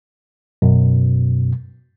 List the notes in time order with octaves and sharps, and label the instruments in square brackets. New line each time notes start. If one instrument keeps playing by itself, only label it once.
[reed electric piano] F#2 B2